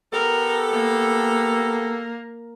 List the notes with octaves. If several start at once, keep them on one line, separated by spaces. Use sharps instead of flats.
B3 G4 A4 A#4
A#3